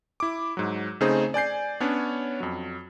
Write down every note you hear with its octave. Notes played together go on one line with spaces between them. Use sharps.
E4 D6
G#2 F#3
C#3 A3 C4 D#4 G#4 C5
D5 G#5 G6 C7
B3 C#4 D4 C#5
F2 F#3